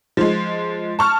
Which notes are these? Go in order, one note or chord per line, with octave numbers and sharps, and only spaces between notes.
F3 G#3
A5 C#6 F6